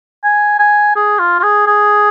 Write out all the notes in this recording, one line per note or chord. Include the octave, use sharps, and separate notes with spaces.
G#5
G#5
G#4
F4
F4
G#4
G#4